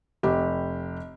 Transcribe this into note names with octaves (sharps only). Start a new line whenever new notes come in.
F1 G4